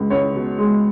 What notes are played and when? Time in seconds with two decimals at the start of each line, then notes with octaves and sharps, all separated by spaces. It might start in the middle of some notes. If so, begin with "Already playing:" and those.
Already playing: C#2 B2 G#3
0.10 C#2 C#5
0.35 B2
0.58 G#3